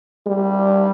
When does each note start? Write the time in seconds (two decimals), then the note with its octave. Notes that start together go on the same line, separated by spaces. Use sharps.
0.27 G3